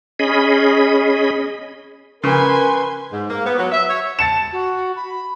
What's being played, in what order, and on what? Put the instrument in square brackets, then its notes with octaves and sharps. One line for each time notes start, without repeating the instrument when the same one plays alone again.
[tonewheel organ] C#4 G#4 D#5 B5
[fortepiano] C#3 [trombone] A#4 [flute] B4 [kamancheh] G#5 C6
[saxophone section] G#2
A#3
B3
F#3
E5
C#5
[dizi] A5 [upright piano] A6 C#7 E7
[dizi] F#4
B5